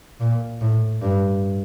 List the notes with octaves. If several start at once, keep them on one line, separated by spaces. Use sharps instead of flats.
A#2
A2
G2